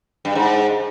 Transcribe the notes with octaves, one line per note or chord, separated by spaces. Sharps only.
G2
G#2